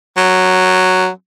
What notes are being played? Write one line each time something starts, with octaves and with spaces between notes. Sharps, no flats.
F#3